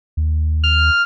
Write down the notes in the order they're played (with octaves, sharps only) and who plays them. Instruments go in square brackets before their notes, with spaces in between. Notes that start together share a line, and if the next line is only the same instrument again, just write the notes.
[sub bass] D#2
[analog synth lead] F6